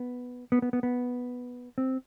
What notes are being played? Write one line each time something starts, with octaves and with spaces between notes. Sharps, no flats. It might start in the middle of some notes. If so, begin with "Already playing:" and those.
Already playing: B3
B3
B3
B3
B3
C4